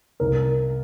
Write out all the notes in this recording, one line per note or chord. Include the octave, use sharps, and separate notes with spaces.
C2 A#4